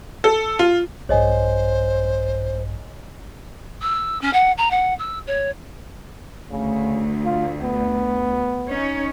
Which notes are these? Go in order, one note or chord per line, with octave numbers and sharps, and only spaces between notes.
A4
F4
A#1 G2 C5 C#5 D#5 G#5
E6
C#4
F#5
A#5
F#5
E6
C#5
D2 C#3
F4
B3
C#4 D#4 C#5